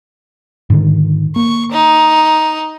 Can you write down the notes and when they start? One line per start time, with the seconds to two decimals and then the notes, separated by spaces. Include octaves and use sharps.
0.70 G#2 D3 D#3
1.36 A#3 C#6
1.71 D#4